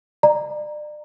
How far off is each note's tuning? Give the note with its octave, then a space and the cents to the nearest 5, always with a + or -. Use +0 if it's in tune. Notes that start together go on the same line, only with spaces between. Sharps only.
D5 +35 A#5 +0